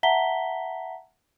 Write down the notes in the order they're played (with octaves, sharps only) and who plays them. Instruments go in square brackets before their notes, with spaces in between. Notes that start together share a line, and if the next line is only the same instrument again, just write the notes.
[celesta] E5 F#5 A5 A#5 B6 G7